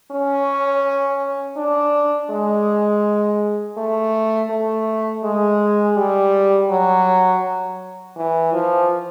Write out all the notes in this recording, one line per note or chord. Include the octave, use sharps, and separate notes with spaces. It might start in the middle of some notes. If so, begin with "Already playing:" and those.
C#4
D4
G#3
A3
A3
G#3
G3
F#3
E3
F3